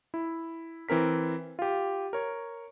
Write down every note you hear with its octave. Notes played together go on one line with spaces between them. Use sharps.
E4
E3 C4 A#4 B6
F4 G4
A#4 C#5